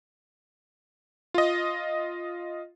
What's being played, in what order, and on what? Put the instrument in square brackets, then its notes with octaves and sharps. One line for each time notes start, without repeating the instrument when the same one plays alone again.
[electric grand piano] F4 D#5